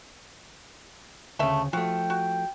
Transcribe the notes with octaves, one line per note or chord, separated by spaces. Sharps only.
D2 C#3 A3 E5
F3 A3 F#4 G5
F#4